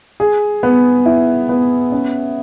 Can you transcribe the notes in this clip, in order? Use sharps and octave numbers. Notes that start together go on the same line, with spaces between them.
G#4
B3
E4
B3
C#4